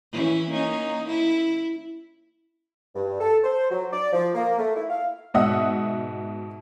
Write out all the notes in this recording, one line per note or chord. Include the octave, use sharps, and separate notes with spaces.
E3 C#4 E4
A#3 C#4 D#4
E4
G2
A4
C5
F#3
D5
F3
A#3
A3
E4
F5
G#2 B2 D#5 E5 F#5 D#6